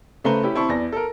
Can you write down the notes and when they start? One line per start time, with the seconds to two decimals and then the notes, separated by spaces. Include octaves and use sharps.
0.24 C#3 A3 B4 C5 A#5 G7
0.43 C#4 E4 G4
0.55 C4 E4 A5 C#6
0.69 E2 D5 A#6
0.92 A4 A#4